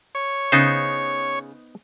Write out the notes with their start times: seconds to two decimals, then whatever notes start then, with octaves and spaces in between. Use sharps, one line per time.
0.15 C#5
0.52 C#3 B3 D#4 C5